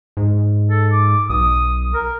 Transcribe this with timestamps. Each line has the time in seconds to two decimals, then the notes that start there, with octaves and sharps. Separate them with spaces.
0.17 G#2
0.70 A4
0.92 D6
1.30 B1 D#6
1.94 A#4